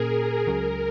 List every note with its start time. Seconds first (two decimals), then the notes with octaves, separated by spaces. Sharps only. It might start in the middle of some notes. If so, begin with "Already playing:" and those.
Already playing: A#2 A#3 C#4 G#4 A#4
0.13 G#4
0.47 C#2 C#3 F#3 A#4